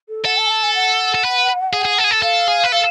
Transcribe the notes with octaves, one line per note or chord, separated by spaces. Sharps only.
A4
A4 F#5
A5
G#5
A5
G#5
F#5
A4
B4
G#4
G#4
A4
G#4
A4
A4 F5
G#4
B4
A4 F5